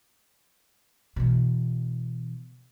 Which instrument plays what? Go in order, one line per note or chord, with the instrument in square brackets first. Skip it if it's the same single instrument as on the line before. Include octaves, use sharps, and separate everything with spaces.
[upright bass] B2 E3